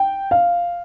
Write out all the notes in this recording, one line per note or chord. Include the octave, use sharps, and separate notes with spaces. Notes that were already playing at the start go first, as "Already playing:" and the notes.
Already playing: G5
F5